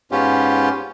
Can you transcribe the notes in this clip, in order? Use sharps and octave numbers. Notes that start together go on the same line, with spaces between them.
G#2 B3 C#4 F4 G4